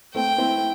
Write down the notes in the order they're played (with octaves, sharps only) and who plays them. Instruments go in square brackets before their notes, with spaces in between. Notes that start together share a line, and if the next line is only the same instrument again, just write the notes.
[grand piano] A3 C4 [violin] G5
[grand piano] C4 E4